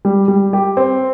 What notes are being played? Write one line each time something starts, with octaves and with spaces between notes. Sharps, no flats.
G3
G3
G4
C4